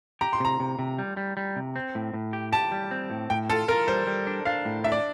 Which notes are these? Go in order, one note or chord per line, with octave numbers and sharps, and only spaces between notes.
G4 A#5
C6
C3 A#5
C3
C3
G3
G3
G3
C3
C4
A2
A2
G4
G4 A5
G3
C4
A2
A2 G5
F4 A4
F4 A#4
G3 C5
G3
D4
D4 F5
A2
D4 E5
D5